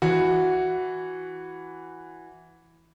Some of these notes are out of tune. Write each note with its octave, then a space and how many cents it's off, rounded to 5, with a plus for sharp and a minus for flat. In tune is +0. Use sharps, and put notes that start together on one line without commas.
E3 +5 F#4 -5